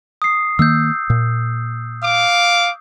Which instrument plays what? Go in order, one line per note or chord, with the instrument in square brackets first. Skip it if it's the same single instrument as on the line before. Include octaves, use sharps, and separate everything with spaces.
[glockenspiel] D#6 C7
[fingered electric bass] D#3 A#3 [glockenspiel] E6 G6
[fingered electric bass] A#2
[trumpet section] F5 D6